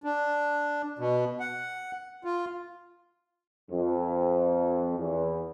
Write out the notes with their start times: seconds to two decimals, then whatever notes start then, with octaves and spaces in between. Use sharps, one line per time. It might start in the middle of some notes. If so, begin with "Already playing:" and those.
0.04 D4
0.99 B2
1.40 F#5
2.24 F4
3.71 F2
4.97 E2